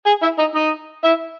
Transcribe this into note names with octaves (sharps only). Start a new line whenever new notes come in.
G#4 G#5
E4 E5
D#4 D#5
D#4 D#5
E4 E5